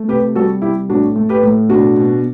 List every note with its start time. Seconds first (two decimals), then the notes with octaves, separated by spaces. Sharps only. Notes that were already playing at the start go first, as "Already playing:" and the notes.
Already playing: A3
0.08 C3 G4 B4
0.35 G3 F#4 A4
0.62 C3 E4 G4
0.89 A2 D4 F#4
1.16 A3
1.29 G4 B4
1.43 A2
1.69 B2 D4 F#4
1.97 B2